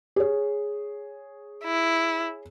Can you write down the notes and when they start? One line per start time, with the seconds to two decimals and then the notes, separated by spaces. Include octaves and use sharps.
0.16 G#4 C#5
1.64 E4